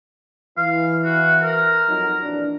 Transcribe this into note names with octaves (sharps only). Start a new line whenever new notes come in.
E3 F5
F#4
A#4
F2 F#3 D#4
A#1 E3 D4